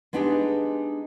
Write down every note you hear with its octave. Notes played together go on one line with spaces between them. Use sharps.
G#3 B3 D4 D#4 G4 G#4